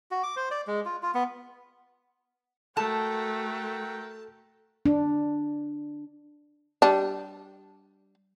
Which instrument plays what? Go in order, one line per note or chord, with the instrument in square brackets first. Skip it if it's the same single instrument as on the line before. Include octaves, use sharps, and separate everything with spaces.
[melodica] F#4
D6
C5
D5
G#3
F4
F4
B3
[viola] A3 F#4 [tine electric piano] A4 [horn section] A#4 F#5 G5 [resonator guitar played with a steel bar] A5
[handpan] D4
[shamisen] G3 D4